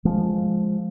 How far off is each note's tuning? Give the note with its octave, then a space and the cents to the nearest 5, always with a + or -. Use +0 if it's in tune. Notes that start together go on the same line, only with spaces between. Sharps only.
F3 +0 G#3 +0